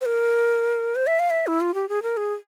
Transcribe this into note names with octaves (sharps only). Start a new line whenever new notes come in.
C5
A#4
C5
E5
F5
E5
E4
F4
G4
G#4
A#4
G#4